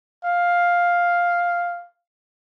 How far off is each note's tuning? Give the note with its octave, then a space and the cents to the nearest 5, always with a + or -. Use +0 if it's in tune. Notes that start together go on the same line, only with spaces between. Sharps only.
F5 +5